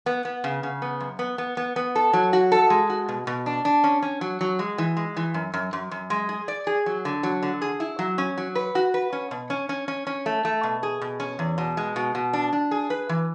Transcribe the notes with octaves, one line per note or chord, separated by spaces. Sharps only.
B3
B3
C#3
C#3
B3
F#2
B3
B3
B3
B3
A4
F#3
F#4
A4
G#3
F#4
B2
B2
D4
D4
C#4
C#4
F#3
F#3
G#3
E3
G#3
E3
F#2
F#2
F#2
F#2
G#3
G#4
D5
G#4
F#3
D3
F#3
D3
G#4
E4
F#3
C#4
F#3
B4
F#4
B4
C#4
B2
C#4
C#4
C#4
C#4
A3
A3
B2
G#4
B2
C#4
E2
B2
G#3
B2
B2
D4
D4
G#4
B4
E3